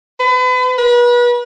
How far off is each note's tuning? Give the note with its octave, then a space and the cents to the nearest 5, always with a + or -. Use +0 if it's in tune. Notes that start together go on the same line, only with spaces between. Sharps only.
B4 +35
B4 -35